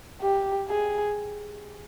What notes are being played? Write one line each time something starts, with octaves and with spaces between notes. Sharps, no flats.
G4
G#4